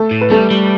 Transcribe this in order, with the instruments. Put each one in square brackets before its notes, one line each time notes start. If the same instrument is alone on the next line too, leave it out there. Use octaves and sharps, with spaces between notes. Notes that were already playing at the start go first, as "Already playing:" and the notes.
Already playing: [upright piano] A3 A4
[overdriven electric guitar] A2
[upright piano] B4
[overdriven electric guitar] G3 [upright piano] A3 A4
[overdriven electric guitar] G3